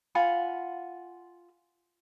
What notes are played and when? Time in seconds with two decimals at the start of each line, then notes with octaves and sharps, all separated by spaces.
0.15 F4 F#5 G#5 B5